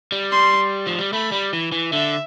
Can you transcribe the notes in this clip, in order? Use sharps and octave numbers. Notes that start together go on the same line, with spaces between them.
G3
C6
F3
G3
A3 B5
G3
E3
E3
D3 E5